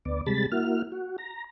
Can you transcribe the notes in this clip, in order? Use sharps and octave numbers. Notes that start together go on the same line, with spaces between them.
D2 B3 D5
C3 G3 G#3 A5 B5 A6
A#3 E4 F#4 F6
F#4
A#5